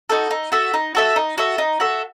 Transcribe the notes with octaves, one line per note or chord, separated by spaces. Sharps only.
D#4 F#4 A4
D#4
F#4 A4 E5
D#4
F#4 A4 E5
D#4
F#4 A4 E5
D#4
F#4 A4 E5